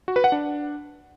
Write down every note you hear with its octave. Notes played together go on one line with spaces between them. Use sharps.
F#4
B4
F#5
D4